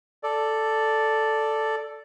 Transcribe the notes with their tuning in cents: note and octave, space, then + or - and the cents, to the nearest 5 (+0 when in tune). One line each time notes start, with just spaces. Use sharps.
A4 +0 D5 +0